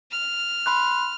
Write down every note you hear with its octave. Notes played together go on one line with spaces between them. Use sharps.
F6
B5 C6 F#6